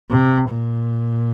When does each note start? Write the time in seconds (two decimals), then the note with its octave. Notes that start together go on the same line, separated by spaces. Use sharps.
0.11 C3
0.49 A#2